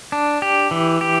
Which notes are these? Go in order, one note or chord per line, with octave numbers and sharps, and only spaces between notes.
D4
G4
E3
G4